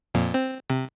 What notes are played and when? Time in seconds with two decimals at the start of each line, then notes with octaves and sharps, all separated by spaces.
0.14 F2 A#2
0.34 C4
0.70 C3